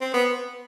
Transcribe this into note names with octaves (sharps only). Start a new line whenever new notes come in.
C4
B3